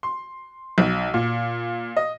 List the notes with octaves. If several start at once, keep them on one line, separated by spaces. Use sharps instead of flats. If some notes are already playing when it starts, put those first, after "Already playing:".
C6
B1
A#2
D#5